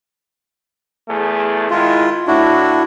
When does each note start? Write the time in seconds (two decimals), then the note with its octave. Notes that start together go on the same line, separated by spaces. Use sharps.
1.08 E2 A3 G#4
1.70 D#3 G#3 E4 F4
2.27 A2 D4 E4 F#4